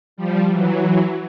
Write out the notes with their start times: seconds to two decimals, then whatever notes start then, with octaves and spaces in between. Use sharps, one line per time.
0.17 F3 G3
0.50 E3 F#3